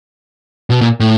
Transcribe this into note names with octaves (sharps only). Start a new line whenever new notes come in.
B2
A#2
A2